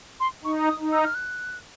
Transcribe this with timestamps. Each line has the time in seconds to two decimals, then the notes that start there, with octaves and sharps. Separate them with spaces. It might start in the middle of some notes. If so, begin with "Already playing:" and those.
0.20 C6
0.44 D#4 C#6
0.68 D#6
0.80 D#4
0.92 E6
1.04 F6
1.15 F#6